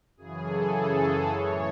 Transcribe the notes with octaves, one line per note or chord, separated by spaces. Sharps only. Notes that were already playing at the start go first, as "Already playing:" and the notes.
F#2 C#3 E3 G#4
A4
A4
A2 E3 C#5